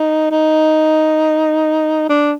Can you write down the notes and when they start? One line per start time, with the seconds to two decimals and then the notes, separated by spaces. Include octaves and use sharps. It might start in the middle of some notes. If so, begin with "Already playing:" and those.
Already playing: D#4
0.31 D#4
2.09 D4